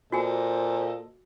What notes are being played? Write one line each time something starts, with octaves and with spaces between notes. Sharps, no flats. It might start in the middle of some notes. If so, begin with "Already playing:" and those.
A#2 F#4 A4 C5 D#5 G#5